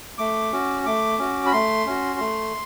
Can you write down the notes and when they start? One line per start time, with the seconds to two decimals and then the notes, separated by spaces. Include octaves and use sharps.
0.18 A3 D6
0.53 C#4 F#4
0.86 A3 D6
1.19 C#4 F#4
1.46 B5
1.52 A3 C6
1.86 C#4 F#4
2.19 A3